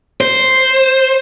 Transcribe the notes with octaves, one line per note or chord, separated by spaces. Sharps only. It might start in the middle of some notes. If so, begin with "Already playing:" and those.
C5